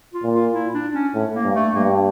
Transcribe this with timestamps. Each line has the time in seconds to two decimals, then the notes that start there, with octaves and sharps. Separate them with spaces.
0.14 F4
0.24 A#2
0.34 F4
0.54 E4
0.74 D4
0.94 C#4
1.15 A2
1.34 A#3
1.44 G2
1.55 A3
1.75 G2 A#3